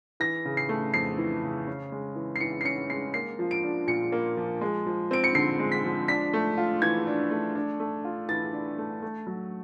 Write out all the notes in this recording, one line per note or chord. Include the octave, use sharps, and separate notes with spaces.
E3 A#6
C#3
C7
A3
F2 C7
E3
C#3
C#4
G#3
E3
C7
E3 C#7
C7
C#4 C#7
G#3 C7
A#3 C7
F3
D7
D4
A#2 C#7
A#3
F3
G#3
F3
C4 D7
C#7
D3 C7
G#3
B6
F3
D4 B6
A3
F4
E3 G#6
D4
A3
D4
A3
F4
E3 A6
D4
A3
A3
F#3